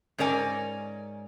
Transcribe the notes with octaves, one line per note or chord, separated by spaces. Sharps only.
G#2 C#4 A#4 D5 G#5